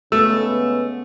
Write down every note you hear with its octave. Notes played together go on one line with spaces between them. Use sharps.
C#3 G#3 A3 B3 E6